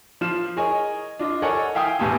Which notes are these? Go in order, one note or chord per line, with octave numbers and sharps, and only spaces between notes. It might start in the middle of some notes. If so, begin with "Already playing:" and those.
F3 F4 F6 E7
G#4 A#4 C#5 D#5 G#5
D4 F4 D#5
A4 A#4 C#5 D#5 F#5 G#5
E5 F5 G5 G#5 D#6
E1 E2 A2 G4 G#5 A5